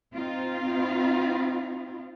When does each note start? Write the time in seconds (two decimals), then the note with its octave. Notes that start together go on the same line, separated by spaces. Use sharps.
0.13 C4 D#4 F4